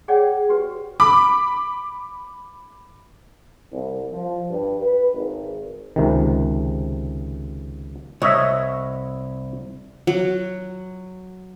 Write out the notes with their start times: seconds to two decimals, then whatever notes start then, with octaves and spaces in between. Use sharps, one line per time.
0.08 G#4 C#5 D5 F#5 G5
0.49 F#4 G4 B4
1.00 B5 D6
3.72 C2
4.12 F3
4.49 G2
4.81 B4
5.14 G#1
5.96 C#2 C3 D#3
8.22 C2 C#5 D#5 E5
10.07 F#3